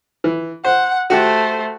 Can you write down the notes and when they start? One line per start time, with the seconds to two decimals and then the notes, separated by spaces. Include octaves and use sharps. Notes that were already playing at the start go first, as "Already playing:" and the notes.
0.24 E3
0.64 C5 F#5
1.10 A3 F#4 G4 C5